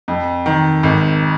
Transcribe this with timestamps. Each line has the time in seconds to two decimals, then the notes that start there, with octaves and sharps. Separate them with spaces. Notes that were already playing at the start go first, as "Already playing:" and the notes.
0.08 F2
0.46 D#3
0.83 G#1